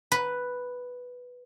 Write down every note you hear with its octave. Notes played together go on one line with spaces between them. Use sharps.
B4